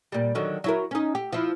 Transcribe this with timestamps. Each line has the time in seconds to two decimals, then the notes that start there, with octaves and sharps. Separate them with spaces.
0.12 A#2 G3
0.35 D3 D#3 F#3
0.64 F#3 E4 A#4
0.91 C#4 D#4
1.15 G4
1.33 F3 E4